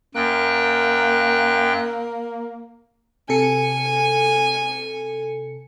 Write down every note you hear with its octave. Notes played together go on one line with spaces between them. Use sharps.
F#2 A#3 G5 F#6
C3 A4 G#5 C#7